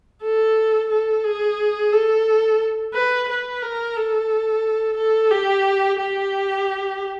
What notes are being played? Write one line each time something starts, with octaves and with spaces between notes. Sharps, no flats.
A4
A4
G#4
A4
B4
B4
A#4
A4
A4
G4
G4